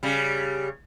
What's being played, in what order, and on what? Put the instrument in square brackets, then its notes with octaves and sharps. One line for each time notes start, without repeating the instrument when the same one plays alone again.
[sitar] C#3 G3